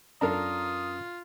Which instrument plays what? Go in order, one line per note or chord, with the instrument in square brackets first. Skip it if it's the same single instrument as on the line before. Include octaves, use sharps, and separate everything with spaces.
[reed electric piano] F#2 C#4 A#5 [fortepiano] D4 A4 A#4 [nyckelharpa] F4 [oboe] D#6